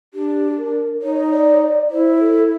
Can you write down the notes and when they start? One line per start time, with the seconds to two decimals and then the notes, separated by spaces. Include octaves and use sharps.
0.14 D4 G4
0.58 A#4
1.02 D#4 C#5
1.32 D5
1.54 C#5
1.61 D5
1.90 E4 C5
2.19 A4